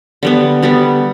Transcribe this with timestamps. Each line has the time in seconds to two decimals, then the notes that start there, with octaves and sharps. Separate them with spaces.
0.23 D3 G3 B3
0.62 D3 G3 B3